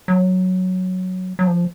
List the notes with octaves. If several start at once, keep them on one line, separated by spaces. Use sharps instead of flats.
F#3
F#3
F3